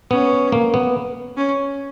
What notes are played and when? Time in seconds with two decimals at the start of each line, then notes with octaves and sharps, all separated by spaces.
0.11 B3 C#4
0.52 A#3
0.74 B3
1.37 C#4